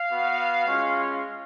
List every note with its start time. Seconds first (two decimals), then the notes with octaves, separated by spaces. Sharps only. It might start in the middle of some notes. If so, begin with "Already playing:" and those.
Already playing: F5
0.11 B3 F#4
0.66 G#3 C#4 F4